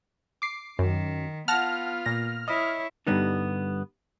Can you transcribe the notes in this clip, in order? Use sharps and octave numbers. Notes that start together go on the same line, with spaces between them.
D6 C7
F#2 D#3
B3 F4 F#5 A5 F6 A#6
A#2 A#6
E4 C#5 D#5
G2 D3 E3 G3 B3 D#4